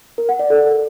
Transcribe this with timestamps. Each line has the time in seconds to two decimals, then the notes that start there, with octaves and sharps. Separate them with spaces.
0.18 A#4
0.29 F#5
0.39 D5
0.50 A4